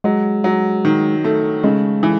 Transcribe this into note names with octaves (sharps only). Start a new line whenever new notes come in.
F#3 G#3
F#3
D#3
A3
C#3 G#3
E3